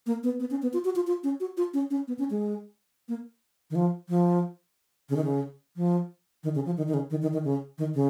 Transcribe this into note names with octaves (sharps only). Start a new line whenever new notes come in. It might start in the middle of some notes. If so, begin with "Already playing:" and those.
A#3
B3
B3
C#4
B3
F4
F#4
F4
F4
C#4
F#4
F4
C#4
C#4
B3
C#4
G#3
A#3
D#3
F3
F3
C#3
D#3
C#3
F3
D#3
C#3
F3
D#3
D#3
C#3
D#3
D#3
D#3
C#3
D#3
C#3